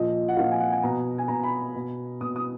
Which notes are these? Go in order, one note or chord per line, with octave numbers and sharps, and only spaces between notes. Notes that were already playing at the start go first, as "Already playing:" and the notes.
Already playing: A#2 F3 D#5
F#5
A#2 F3 F5
G#5
F#5
G#5
B2 A#5
G#5
B2 A#5
B5
B2
B2 D#6
D#6